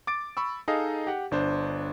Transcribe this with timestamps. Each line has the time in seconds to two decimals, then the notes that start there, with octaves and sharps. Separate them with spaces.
0.07 D6 A6 D7
0.37 B5 C#6 E6
0.68 D#4 G#4 A4 D#5 F5
1.07 G4 F#5
1.31 G1 D4 C5